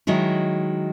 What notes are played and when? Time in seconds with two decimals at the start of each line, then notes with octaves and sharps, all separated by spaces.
0.07 D#3 F#3 G#3 E4